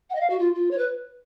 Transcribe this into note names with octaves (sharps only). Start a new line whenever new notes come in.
F#5
D#5
F5
F#4
F4
F4
C#5
B4